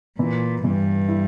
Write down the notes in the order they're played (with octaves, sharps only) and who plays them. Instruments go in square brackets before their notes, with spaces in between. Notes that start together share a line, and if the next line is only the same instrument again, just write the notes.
[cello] A#2 [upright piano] E3
[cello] G2 [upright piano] E3
[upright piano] E4